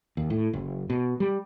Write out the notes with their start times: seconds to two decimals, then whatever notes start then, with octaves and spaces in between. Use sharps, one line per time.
0.17 D#2
0.30 A2
0.53 F#1
0.90 B2
1.20 G3